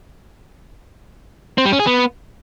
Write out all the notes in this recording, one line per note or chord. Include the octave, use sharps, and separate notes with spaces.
C4
G3
C#4
G#4
B3